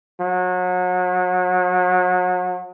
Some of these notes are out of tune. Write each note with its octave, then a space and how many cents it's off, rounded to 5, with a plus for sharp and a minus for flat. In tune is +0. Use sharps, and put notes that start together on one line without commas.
F#3 -35